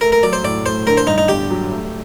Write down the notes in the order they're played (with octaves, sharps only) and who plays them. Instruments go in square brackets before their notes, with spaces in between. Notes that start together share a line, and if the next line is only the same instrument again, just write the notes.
[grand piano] A3 [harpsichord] A#4
[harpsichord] A#4
[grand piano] F#3 [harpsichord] D5
[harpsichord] C5
[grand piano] A2 [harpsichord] D5
[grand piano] A2 [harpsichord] C5
[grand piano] D3 [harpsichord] A#4
[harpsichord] C5
[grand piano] G2 [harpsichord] D#4
[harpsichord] D#4
[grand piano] G1 [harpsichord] G4
[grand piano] F#3
A3